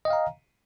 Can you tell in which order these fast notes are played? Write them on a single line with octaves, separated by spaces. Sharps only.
D#5 G5 F5 A#5